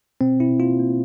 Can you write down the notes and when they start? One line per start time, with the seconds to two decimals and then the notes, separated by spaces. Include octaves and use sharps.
0.21 B2 C4
0.40 B2 E4
0.60 A#3 F4
0.79 A#3